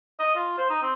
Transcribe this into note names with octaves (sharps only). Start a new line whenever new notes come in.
D#5
F4
C5
D#4
C4